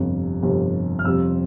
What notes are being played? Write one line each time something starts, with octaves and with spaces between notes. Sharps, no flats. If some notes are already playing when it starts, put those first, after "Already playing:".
Already playing: G1 F2 C3 G3
G1 F2 C3 G3
F6
F2 C3 G3 C4 E6